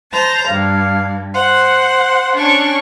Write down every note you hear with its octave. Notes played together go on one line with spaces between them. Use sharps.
C5 A5 A#5
G2 F5
C5 F#5
C#4 D4 C#6